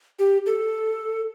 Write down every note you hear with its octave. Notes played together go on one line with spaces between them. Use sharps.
G4
A4